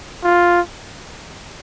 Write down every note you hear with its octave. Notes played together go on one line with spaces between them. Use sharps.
F4